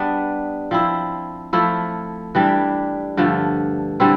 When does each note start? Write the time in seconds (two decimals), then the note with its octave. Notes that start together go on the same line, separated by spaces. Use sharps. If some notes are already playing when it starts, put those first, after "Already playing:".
Already playing: G3 B3 D4
0.71 F3 C4 E4
1.53 F3 A3 E4
2.35 E3 G3 D4 G4
3.17 G2 D3 F3 A3
4.00 D3 G3 C4 E4